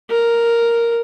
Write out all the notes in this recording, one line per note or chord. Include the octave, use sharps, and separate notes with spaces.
A#4